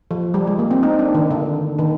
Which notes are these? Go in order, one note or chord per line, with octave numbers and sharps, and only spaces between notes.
F3
G3
G#3
A#3
C4
D#4
D4
D#3
D3
D#3